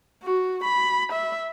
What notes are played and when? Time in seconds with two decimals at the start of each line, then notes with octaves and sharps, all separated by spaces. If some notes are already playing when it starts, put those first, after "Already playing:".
0.23 F#4
0.64 B5
1.12 E5